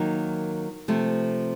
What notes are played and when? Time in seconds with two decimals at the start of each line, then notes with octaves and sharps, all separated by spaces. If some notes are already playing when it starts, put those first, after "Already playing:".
Already playing: D#3 F#3 A#3 D#4
0.88 C3 F3 A3